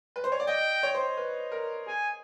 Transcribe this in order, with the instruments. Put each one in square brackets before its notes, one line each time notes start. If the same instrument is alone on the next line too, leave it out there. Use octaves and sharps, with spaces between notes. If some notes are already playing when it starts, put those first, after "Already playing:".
[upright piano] B4
C5
C#5
D5
[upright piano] D#5 [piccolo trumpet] G5
[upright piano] C#5
C5
B4
A#4
[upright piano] G#4 [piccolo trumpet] G#5